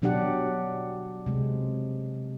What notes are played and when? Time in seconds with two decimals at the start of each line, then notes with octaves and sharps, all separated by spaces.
0.02 B2 F#3 D4 G4 D5 F#5
1.26 C3 G#3